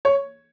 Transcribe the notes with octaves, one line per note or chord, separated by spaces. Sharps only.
C#5